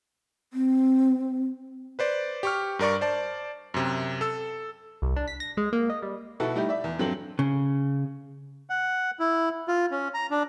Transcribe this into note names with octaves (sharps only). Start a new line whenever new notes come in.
C4
B4 C5 D5
G4 C#6 F6
G2 A#4 D5 C#6
C5 D5 A5
F#2 C3
A4 E6
C2
D4
B6
A#6
G#3
A#3
D#5
G3
B2 B3 E4 F#4 A4
G3 A3 D#4 E4 G4
D5 E5
E2
G2 F#3 C4 A4 F#7
C#3
F#5
E4
F4
C#4
A#5
D4